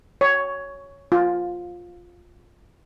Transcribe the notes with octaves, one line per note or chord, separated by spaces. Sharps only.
C#5
F4